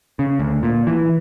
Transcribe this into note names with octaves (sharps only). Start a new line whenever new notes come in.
C#3
D2
A#2
E3